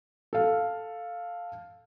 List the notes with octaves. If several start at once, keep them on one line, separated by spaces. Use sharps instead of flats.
A4 F5